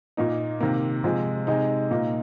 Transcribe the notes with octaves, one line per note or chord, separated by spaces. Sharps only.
A#2 A#3 D#4
C3 D#3 A#3
C3 F3 G#3
C3 G#3 D#4
A#2 A#3 D#4